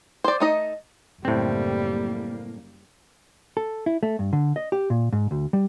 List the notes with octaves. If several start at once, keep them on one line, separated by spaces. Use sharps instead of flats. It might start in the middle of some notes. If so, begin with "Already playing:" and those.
C5 D5
A3 D#4 D#5
F#1 A2 G3 A#3 C4 C5 E5
A4
E4
A3
G2
D3
D#5
G4
A#2
G#2
D2
G3